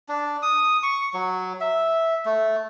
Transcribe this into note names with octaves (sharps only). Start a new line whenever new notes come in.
D4
D#6
C#6
F#3
E5
A3